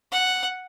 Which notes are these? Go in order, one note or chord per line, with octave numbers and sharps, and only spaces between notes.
F#5